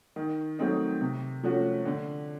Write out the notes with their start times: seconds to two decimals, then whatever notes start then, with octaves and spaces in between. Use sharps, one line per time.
0.16 D#3
0.59 F#3 A3 C4 D#4
1.01 C3
1.43 F3 A3 C#4 F#4
1.85 D3